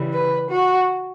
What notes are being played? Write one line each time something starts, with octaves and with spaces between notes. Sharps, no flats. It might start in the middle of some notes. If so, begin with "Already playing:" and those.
Already playing: C#3 E3 G3
B4
F#4